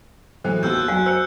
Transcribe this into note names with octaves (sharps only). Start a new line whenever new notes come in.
A2 E3 F#3 C5
D#2 B3 F#4 E6 F#6 G6
F#2 F#4 F5 G#5
C5 E6 C#7